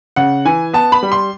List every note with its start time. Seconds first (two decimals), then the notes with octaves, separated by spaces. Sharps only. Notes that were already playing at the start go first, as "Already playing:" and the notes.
0.16 C#3 F#5
0.45 E3 G#5
0.73 B3 A5
0.92 B5
1.03 G3
1.12 C6